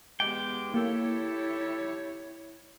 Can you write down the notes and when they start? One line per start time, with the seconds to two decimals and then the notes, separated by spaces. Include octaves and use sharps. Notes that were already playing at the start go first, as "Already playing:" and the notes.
0.20 E2 G#3 B3 G4 G5 D6
0.74 A#3 E4 G4 A4 C#5